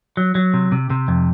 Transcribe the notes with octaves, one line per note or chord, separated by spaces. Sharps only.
F#3
F#3
C3
C3
C3
F2